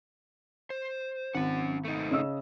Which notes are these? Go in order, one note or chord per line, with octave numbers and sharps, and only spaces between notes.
C5
G#1 C#4 F#5
A3 D#4
C#3 D#5 E6